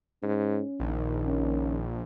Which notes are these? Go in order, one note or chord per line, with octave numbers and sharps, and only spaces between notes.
G#2 C#4
A#1 D#3
C#4